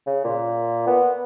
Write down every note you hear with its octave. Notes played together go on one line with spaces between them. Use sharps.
C#3
A#2
B3